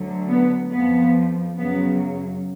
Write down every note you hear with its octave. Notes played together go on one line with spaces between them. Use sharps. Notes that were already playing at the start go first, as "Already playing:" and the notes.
Already playing: D2 D3 F#3
B3
F2 F3 B3
F#2 C#3 F#3 B3